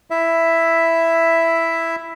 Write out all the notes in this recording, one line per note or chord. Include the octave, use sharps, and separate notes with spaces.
E4 E5